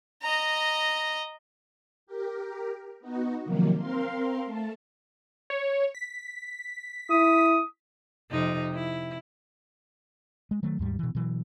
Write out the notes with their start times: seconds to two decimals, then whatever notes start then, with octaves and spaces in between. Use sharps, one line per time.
0.22 D#5 A#5
2.07 G4 A#4
3.00 B3 D#4 F#4
3.44 C3 D#3 F3 F#3 A#3
3.76 C4 A#4 F5 C6
4.45 A3 A5
5.50 C#5
5.95 B6
7.10 E4 D#6
8.31 F2 C3 D#4
8.74 E4
10.51 G#3
10.63 D#3 F#3 A3
10.79 D#2 G#2 G3
10.99 B2 E3
11.15 B2 E3 F#3